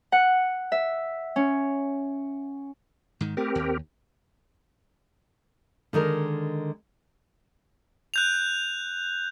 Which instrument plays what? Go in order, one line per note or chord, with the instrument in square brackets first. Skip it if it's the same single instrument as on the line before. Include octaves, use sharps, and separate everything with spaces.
[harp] F#5
E5
C#4
[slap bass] G#2 D#3
[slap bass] A3 [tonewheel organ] C4 G4 A#4
[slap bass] D#2
[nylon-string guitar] D3 D#3 G#3 A#4
[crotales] F#6 G6 F7